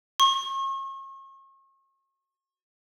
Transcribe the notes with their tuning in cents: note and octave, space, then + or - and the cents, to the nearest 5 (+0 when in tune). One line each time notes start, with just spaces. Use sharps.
C#6 -40